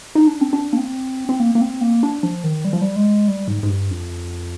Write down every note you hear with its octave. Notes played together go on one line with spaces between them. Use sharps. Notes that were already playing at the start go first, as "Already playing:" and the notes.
D#4
D4
C4
D4
A#3
C4
C4
A#3
A#3
C4
A#3
D4
F3
D#3
G3
F3
G3
G#3
G3
G#2
G#2
G2
F2